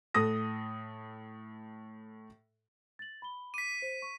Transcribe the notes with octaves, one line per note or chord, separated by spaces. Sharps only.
A2 A4 D#6 A#6
A6 F#7
B5 G7
D6 B6 D#7
C5
C#6